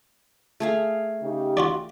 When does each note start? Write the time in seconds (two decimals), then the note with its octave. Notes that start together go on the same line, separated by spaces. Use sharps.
0.60 A3 G#4 F5
1.21 C#3 D#4 G4
1.57 F4 F#4 D5